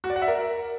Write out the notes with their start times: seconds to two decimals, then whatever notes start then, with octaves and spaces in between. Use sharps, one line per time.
0.04 F#4
0.10 D5
0.16 F#5
0.22 E5
0.28 A#4